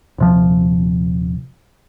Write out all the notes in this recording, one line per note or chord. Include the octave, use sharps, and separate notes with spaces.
D#1 C3 F3